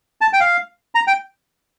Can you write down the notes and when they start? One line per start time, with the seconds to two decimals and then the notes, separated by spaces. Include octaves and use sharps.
0.21 A5
0.33 G5
0.40 F5
0.95 A#5
1.07 G5